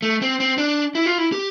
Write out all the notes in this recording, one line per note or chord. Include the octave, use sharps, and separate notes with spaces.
A3
C4
C4
D4
E4
F4
E4
G4